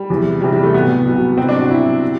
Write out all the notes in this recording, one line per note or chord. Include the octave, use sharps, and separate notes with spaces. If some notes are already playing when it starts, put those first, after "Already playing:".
Already playing: G3
E2 C3 E3
E2 C3 E3 G3
G3
A3
C2 B2 F#3 B3
C2 B2 F#3
C2 B2 F#3 C4
D4
F#4
C2 B2 F#3 E4
C3